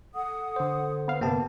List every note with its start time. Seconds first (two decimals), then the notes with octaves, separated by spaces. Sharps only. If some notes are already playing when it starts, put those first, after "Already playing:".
0.14 A4 F#5 D#6
0.56 D3 C5
1.08 B3 F5
1.21 G1 C3 A#3 B3 G5 A5